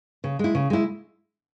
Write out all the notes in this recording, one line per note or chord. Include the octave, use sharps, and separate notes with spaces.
C#3
G#3 E4
C#3
G#3 E4